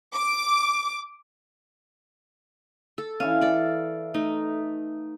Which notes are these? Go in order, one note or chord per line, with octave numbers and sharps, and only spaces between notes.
D6
A4
E3 C#4 F5
A4 D5
A3 D#4